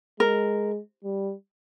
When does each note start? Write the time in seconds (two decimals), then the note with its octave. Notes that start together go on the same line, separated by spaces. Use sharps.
0.20 G#3 A#4
1.04 G3